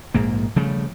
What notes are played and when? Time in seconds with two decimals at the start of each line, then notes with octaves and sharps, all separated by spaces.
0.14 A#1 G#2 A#3
0.56 C#3 F3 G3 A3